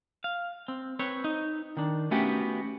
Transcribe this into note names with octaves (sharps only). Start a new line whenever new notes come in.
F5
C4
C4 B4 C#5
D#4
D#3 D4
A3 B3 C#4 F#4 G4